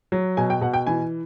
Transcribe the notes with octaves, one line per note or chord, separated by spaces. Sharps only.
F#3
B2 G#5
G5
B2 F#5
G5
E3 G#5